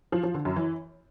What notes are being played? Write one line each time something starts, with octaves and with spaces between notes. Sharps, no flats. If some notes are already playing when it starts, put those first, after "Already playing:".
F3
F3
D3
F#2
E3